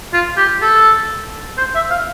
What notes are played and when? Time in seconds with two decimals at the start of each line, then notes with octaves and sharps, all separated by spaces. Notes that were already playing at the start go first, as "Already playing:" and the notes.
0.13 F4
0.37 G4
0.62 A4
1.58 C5
1.75 E5
1.90 F5